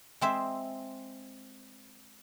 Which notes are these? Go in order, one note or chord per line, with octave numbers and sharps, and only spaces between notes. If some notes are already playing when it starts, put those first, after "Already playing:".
G#3 C4 E5